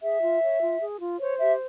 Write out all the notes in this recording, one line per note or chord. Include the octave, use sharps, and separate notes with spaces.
G#4 E5
F4
C#5
F4
G#4
F4
C5 C#5
G4 E5